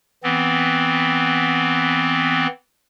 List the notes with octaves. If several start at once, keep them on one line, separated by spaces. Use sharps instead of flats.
E3 B3 C4